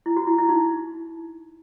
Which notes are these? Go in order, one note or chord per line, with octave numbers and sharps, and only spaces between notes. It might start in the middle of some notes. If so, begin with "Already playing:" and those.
E4
F#4
E4
E4
D#4